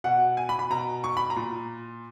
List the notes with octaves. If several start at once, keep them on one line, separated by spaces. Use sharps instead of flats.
B2 F#5
G#5
B5
B5
B2 A#5
C#6
B5
A#5
A#2